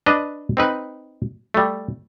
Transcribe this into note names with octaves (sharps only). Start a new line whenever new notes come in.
D4 B4 D#5
C4 D#4 B4
G3 A3